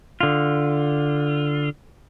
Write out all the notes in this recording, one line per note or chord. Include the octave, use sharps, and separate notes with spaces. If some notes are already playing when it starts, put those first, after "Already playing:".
D3 F4